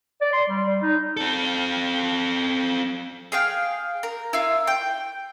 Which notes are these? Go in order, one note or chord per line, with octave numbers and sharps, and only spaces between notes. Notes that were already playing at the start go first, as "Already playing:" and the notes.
D5
C6
G3
G3
D#4
C4 A4
G#4 F5 G5
A#4
E4 F4
G5